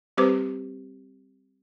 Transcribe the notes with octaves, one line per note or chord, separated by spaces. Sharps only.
G3 C4 G4 B4 C5 D6